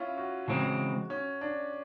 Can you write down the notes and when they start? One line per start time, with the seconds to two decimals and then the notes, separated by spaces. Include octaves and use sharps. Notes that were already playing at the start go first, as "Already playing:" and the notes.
Already playing: C#4 E4 F4
0.17 F#4
0.48 C#3 E3 G#3 C4
1.10 C#4
1.41 D4